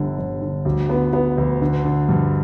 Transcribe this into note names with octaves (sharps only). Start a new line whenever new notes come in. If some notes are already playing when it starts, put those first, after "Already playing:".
Already playing: G1 D3
G1
D3
D2
B3
B3
D2
D3
D3
G2